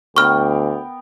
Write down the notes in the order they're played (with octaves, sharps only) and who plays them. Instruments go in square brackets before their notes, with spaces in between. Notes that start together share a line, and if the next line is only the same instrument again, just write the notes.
[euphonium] D2 [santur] B3 A#4 G5 [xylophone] C#6 F6